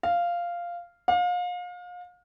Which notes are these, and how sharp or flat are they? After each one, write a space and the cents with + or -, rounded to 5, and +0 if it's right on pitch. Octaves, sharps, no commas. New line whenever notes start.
F5 -5
F5 +35